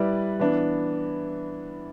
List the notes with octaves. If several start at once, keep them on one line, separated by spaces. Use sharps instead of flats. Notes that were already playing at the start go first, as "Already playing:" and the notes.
Already playing: G3 E4 B4 D5
E3 B3 D4